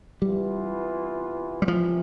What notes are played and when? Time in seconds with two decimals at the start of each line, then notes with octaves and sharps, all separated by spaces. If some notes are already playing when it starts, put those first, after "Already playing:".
0.21 C3 E3 G3 B3 F4
1.62 G3
1.68 C2 C3 E3 F3